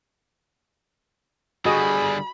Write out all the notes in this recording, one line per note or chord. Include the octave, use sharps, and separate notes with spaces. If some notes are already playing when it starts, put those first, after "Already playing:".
D3 G3 F#4 G#4 D#5 B5